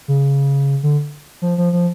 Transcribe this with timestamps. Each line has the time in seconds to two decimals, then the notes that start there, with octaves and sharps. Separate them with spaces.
0.08 C#3
0.83 D3
1.42 F3
1.58 F3
1.73 F3